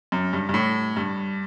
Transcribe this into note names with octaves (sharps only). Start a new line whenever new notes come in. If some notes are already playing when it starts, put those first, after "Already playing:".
F#2
G2
G2
A2
G2